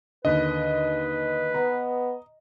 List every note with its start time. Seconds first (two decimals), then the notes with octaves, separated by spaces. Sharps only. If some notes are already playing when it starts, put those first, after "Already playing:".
0.25 D#2 D3 B4 D#5
1.54 B3 A#5